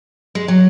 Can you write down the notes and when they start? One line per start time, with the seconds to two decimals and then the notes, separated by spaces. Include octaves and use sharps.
0.35 G#3
0.48 F#3